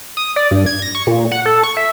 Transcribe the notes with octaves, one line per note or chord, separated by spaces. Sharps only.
D#6
D5
G2
G#6
A#6
C#6
A#2
F#5
A4
C#6
E5